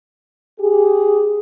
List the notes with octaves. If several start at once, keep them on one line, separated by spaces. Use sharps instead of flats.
G4 G#4